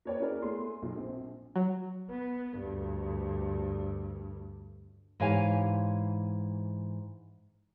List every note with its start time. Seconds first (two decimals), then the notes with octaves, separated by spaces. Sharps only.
0.05 A#3 B4 C#5 D5 G5
0.20 C#4 E4 F#4 G#4 A#4 D5
0.42 A3 B3 G#4 C6
0.82 B1
0.96 A#1 C4
1.56 F#3
2.10 B3
2.58 D2 G2
5.20 G#2 E3 G4 C#5 F5 G#5